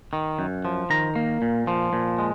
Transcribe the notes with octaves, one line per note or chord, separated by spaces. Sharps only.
D#3
F#2
F3
D#3 A#5
A#3
A#2
F3
A#2
G#3